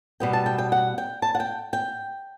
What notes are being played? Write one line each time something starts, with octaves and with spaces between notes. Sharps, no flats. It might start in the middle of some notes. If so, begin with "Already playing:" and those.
B2 G3 B3 G5
A5
G5
G5
F#5
G5
A5
F#5
G5
G5